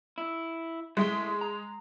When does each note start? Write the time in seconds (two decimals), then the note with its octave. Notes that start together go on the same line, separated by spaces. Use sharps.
0.18 E4
0.97 A2 G#3 E5 C6
1.41 A#5